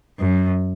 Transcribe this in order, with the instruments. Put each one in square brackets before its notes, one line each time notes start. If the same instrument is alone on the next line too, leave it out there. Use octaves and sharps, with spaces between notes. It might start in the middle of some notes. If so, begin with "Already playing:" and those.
[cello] F#2